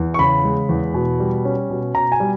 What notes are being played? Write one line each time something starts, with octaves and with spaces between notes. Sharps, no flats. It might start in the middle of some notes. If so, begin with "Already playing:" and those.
Already playing: E2
C#6
C#3 B5
G#3
E2
B2
G3
C#4
B2
B2 A#5
G#5
G3